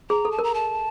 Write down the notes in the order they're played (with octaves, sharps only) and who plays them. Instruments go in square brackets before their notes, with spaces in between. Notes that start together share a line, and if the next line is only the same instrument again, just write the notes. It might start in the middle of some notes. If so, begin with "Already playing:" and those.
[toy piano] G#4 [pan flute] A#5
[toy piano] A4
[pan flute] A5
[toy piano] A#4
[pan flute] A#5
A5